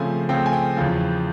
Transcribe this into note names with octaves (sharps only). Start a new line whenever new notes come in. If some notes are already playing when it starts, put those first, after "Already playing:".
Already playing: C#3 F3 A3 C4 G#5
C#3 F3 A3 C4 G5
G#5
G5
E2 C#3 F3